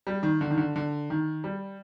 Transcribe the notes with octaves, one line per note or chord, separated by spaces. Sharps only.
G3
D#3
D3
D#3
D3
D3
D#3
G3